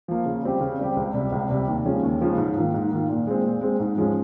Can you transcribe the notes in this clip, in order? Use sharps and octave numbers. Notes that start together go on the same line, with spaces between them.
F3 A#3
C#3
G3 C4 G4
C#3
G3 C4 G4
C#2
C3 G3
C#2
C3 G3
D#2
C#3 F3 G#3 C#4
D#2
C#3 F3 G#3 C#4
G#2
D#3 A#3 F4
G#2
D#3 A#3 F4
A#2
G#3 C4
A#2
G#3 C4
G#2
F3 G#3 C#4